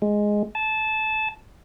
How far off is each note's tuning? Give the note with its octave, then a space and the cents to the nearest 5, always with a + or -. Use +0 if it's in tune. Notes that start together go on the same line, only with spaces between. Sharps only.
G#3 +0
A5 -15